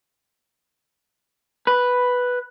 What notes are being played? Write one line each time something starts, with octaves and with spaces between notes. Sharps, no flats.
B4